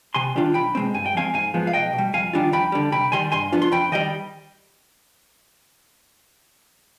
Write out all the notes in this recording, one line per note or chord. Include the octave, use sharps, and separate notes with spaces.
C3 G#5 C6
D#3 G3 D4 F4
B1 G5 B5
B2 G#3 C4
G2 G#5
G5
F3 G#3 C4 F5 G#5
G#2 F5 G#5
F3 G#3 B3
F5
B1 D#5 G5
B2
G3
F2 F5 G#5
D#3 G3 D4 F4
F2 G5 B5
D3 G3
C3 G5 B5
D#3 G3 G#5 C6
G2 G#5 C6
F3 B3 D4 F4
C6
F2 G5 B5
D#3 G3 D#5 G5